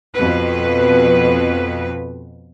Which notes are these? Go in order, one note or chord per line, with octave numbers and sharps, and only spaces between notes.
F2 B2 B4